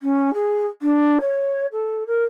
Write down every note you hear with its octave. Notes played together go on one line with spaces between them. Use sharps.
C#4
G#4
D4
C#5
A4
A#4